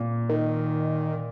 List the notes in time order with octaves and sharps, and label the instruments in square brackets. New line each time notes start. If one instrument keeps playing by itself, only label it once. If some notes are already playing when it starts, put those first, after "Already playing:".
Already playing: [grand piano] A#2
[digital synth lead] D#3